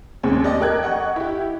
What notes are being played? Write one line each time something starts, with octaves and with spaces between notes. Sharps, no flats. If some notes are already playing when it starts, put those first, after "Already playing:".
D#2 G#2 C4 C#4
G4 D5 D#5
A4 A#4 G5 F#6 G#6
D#5 F#5 C#6
E4 G4